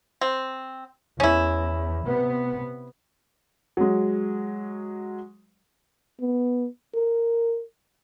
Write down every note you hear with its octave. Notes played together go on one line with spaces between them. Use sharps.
C4
E2 C#4 E4
C3 B3
F#3 G#3
B3
A#4